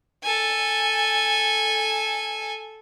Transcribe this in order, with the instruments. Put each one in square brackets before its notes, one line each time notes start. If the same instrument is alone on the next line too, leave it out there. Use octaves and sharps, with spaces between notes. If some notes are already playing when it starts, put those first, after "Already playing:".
[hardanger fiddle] A4 G#5